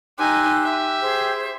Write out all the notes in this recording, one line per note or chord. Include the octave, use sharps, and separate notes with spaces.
D#4 G4 G#5 C6 E6 F#6
E5
G#4 C5